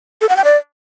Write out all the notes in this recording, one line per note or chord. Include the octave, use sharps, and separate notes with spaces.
A4
F#5
G5
D5